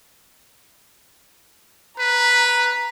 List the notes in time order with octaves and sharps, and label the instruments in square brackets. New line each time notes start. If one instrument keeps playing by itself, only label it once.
[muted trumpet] B4 [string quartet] A#5